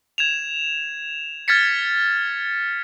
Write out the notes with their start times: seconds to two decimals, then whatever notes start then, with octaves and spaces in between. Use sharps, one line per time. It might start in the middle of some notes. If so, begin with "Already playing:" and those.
0.18 G#6 E7 F7
1.48 F6 G#6 A6 B6 C#7